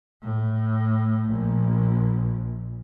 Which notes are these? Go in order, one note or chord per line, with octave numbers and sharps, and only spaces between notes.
A2
A#1